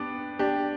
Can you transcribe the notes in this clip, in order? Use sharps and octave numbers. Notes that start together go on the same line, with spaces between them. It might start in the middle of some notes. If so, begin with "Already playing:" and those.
Already playing: B3 D4 G4
D4 G4